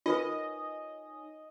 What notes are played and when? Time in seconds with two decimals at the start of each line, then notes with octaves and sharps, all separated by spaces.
0.06 D#4 F4 A#4 B4 C#5 D#5 G#5